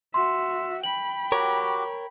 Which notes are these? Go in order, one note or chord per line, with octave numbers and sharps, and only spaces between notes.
F#4 E5 C6
G5 B5 F#7
F#4 G4 A#4 C#5